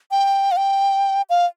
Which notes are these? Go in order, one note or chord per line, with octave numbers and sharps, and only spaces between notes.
G5
F5
G5
F5